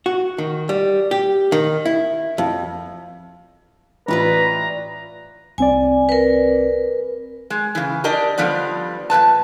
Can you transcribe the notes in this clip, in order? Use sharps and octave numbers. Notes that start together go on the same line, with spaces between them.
F#4
D#3
G3
G4
D#3
E4
F2
A1 E4 F4 B4 D5 A#5
C2 C4 D5 G#5
A#4 B4
G#3
C#3 E3
D4 G4 A#4 D5 D#5
D3 F3 G3 B3 D5
A#2 E3 B4 A5